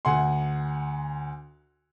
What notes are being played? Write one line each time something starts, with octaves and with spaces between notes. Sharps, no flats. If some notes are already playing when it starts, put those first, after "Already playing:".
D2 F#5 G#5 C6